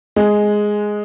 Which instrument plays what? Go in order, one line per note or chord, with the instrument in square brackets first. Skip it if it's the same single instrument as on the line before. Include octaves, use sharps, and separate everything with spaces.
[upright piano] G#3